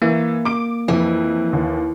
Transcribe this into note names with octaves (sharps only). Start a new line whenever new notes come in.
E3 A#3
D6 D7
F2 E3
D#2